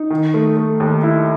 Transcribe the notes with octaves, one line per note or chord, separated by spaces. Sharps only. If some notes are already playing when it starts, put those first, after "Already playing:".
Already playing: D#4
D#3
A3
A3
D#2
E4